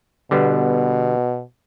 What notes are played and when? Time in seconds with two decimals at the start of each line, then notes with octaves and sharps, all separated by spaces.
0.31 B2 D3 G3 B3